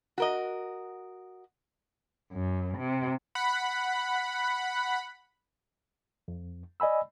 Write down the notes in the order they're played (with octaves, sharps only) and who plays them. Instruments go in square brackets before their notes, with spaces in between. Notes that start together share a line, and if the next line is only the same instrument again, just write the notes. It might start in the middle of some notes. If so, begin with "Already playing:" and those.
[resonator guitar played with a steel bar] F#4 A#4 D#5
[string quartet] F#2
C3
[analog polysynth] F#5 B5
[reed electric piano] F2
D5 D#5 G#5 B5 E6